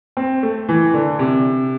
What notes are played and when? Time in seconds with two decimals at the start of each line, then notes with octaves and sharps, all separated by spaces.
0.17 C4
0.43 A3
0.68 E3
0.94 D3
1.19 C3